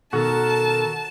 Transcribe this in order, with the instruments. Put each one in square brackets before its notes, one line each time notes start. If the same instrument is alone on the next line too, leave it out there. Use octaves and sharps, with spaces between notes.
[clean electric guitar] B2 D#3 [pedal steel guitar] F#4 A#4 [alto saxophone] A4 [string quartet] A5